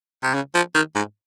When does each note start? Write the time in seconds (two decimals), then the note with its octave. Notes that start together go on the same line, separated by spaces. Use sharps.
0.23 C3
0.34 C#3
0.55 F3
0.75 D#3
0.95 G#2